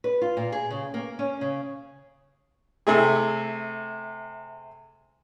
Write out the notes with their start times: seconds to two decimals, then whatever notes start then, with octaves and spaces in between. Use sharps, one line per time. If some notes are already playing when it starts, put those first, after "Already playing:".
0.04 B4
0.22 F4
0.37 A#2
0.52 G#4
0.71 C#3
0.94 A#3
1.19 C#4
1.41 C#3
2.87 C3 A3 G#4